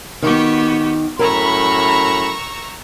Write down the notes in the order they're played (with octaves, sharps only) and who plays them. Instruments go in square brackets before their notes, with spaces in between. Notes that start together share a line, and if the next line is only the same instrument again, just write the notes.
[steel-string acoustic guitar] D#3 [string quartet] B3 F#4 G4
[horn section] F#2 A2 B5 [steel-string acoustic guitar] A#4 [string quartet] A#5 C#6 E6